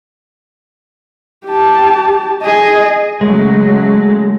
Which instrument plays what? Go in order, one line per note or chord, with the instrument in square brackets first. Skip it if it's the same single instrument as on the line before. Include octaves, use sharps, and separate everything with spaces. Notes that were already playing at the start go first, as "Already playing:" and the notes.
[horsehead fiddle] G4 A5
G#4 D#5
[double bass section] C#3 F#3 A3 [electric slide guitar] G#3